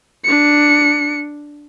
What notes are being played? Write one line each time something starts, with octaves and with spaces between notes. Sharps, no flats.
D4 C#7